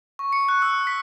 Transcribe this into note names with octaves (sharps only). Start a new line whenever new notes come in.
C#6
C#7
F#6
E6
B6